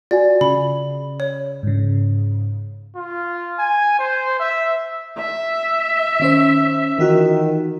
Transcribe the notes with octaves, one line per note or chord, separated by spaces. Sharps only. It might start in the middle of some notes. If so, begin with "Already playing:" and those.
F4 F#4 D5 G#5
C#3 B5
C#5
G#2 C#3
F4
G#5
C5
E5
E5
D#3 C#4 C5
D#3 E3 F4 F#4